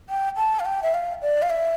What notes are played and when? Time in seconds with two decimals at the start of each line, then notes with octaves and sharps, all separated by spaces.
0.09 G5
0.37 A5
0.60 F5
0.65 G5
0.83 E5
0.94 F5
1.22 D5
1.42 F5
1.50 E5